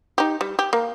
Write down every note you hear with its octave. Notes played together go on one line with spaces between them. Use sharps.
D#4 G4
G3
G4
A#3